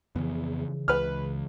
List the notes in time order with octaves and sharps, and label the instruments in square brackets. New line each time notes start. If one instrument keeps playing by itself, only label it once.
[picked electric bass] F2 B3 [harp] C#3 E3
[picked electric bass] C#2 [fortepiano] B4 F6